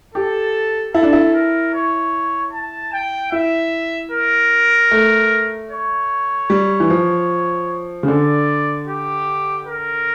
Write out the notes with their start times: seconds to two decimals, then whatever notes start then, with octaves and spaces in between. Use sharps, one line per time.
0.14 G4 A4
0.94 E4 A4
1.03 D4
1.13 E4
1.34 A#4
1.74 C#5
2.53 A5
2.93 G5
3.32 E4 E5
4.11 A#4
4.91 A3
5.71 C#5
6.50 G3
6.80 E3
6.90 F3
8.03 C#3
8.08 D3 D5
8.88 G4
9.67 A#4